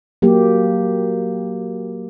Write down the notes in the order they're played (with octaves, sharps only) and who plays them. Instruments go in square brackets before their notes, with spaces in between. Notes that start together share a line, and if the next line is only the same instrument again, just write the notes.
[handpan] F#3 A#3 G4